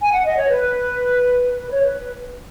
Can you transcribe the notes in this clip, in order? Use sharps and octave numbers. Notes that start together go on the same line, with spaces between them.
G#5
F#5
D#5
C#5
B4
B4
C#5
B4